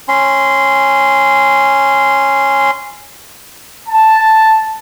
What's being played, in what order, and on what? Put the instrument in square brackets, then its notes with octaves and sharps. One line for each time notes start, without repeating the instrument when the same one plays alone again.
[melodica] C#4 C6
[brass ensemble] A5